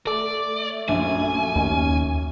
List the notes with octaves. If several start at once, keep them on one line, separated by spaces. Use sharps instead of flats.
A3 A4 D5
A#1 F#2 G#5
D#2 C#4